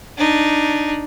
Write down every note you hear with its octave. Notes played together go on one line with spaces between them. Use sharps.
D4 D#4